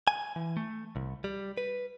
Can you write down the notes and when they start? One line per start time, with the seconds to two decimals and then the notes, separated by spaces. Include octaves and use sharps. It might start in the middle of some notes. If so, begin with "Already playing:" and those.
0.08 G#5
0.36 E3
0.57 A3
0.96 C2
1.24 G3
1.57 B4